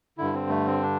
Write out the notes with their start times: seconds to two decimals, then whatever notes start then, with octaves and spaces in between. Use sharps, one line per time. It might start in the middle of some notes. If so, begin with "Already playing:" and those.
0.18 G2 D3 E4
0.33 C4
0.50 A3
0.67 C4
0.82 D4